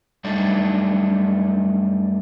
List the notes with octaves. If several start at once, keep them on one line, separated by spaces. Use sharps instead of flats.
F#2 G3 A3 D4 D#4